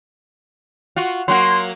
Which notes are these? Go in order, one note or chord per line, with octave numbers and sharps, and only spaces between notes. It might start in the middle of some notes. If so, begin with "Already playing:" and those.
F4 F#4
F#3 A#3 F#4 C6